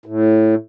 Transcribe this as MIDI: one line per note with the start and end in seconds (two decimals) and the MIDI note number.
0.06 0.55 45